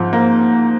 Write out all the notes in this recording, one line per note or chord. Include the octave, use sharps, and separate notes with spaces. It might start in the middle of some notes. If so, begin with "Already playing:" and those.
Already playing: G#2 F3
A#3